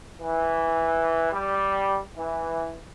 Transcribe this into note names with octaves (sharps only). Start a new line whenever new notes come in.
E3
G3
E3